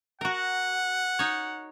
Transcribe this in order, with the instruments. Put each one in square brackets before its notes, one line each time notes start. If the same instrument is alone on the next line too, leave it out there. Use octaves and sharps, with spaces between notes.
[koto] F#4 A#4 [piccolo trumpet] F#5
[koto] D#4 C#5